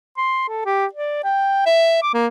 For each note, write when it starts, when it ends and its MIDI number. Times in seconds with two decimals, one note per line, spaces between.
0.17 0.44 84
0.48 0.61 69
0.65 0.86 67
0.93 1.21 74
1.24 1.64 79
1.66 1.99 76
2.02 2.10 86
2.14 2.27 58